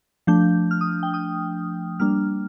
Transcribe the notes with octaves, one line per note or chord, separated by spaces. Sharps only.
F3 A3 D4 G6
F6
D#6
G5
D#6
G3 A#3 D4 F6